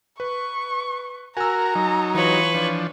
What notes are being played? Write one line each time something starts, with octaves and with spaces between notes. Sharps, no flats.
B4 C#6
F#4 A#4 G#5 A#5 E6
F#3 D#4
E3 F4 B4 C#5
F3 D4